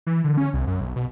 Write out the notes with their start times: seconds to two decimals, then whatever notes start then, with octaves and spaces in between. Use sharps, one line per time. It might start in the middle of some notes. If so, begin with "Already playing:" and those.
0.07 E3
0.24 D3
0.37 C#4
0.54 C2
0.67 F#2
0.81 B1
0.96 B2